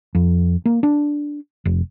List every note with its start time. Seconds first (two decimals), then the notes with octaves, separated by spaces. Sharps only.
0.15 F2
0.65 A#3
0.83 D4
1.65 F1